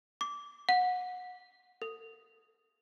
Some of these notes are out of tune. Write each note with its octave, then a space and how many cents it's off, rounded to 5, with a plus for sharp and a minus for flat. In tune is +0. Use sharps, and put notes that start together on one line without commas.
D6 -20
F#5 -25
A4 +40